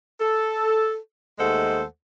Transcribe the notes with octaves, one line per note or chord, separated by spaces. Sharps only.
A4
D#2 G#3 A3 A4 C5 F#5